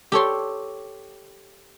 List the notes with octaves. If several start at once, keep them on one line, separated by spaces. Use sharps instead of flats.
G4 A4 C#5 C6